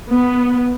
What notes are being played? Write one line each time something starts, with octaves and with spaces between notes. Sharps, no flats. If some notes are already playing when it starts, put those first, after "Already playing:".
B3